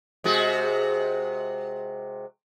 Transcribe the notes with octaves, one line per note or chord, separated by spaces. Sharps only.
C3 G#3 F#4